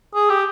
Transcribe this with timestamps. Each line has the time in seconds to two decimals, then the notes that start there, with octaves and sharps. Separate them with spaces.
0.15 G#4
0.30 G4